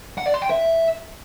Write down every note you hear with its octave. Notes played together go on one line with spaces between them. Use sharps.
F#5
D5
C6
G5
E5